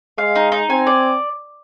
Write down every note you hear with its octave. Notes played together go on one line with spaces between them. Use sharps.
G#3 F5
D#4
D#4
C4 G#5
D5